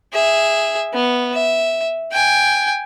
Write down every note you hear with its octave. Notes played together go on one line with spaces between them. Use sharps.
G#4 E5
B3
E5
G5 G#5